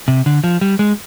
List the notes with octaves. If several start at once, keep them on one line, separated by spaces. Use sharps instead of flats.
C3
D3
F3
G3
G#3